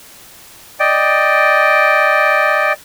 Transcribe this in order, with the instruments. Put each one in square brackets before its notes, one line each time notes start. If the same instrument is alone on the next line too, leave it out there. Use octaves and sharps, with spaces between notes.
[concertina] D5 D#5 G5